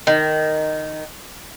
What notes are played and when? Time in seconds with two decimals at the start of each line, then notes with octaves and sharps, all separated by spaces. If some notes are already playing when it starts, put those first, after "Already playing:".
0.07 D#3